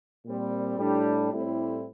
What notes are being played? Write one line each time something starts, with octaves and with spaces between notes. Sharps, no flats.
A#2 G3 C4
A2 G3 D4
A2 G3 C4 E4